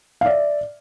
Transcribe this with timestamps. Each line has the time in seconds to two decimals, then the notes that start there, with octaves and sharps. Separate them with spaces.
0.21 F5
0.25 D5 E5